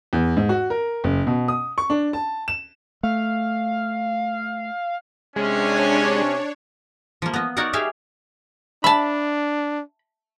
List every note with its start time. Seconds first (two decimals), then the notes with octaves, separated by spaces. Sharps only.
0.13 E2
0.37 G#2
0.49 F#4
0.70 A#4
1.04 F#1
1.27 B2
1.48 D#6
1.78 C#6
1.90 D4
2.13 A5
2.48 E7
3.03 A3 F5
5.36 C3 G#3 C#4 D4 C#5
7.22 F3 A#3
7.33 B3 D#5
7.57 D#4 F#4 A#4 C#5 D5 F#5
7.73 G4 G#4 E5 F5
8.84 D4 E5 A5 B5